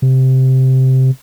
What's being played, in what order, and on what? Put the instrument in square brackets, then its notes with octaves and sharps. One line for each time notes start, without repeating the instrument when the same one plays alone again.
[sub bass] C3